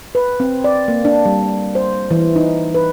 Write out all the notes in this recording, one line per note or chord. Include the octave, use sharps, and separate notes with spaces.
B4
C4
D5
A#3
D4
G3
C5
E3
D#4
B4